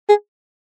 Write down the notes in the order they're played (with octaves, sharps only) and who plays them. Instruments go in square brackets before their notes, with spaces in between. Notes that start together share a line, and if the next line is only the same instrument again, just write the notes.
[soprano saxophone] G#4